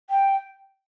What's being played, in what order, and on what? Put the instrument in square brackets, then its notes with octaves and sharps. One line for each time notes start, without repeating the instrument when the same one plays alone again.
[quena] G5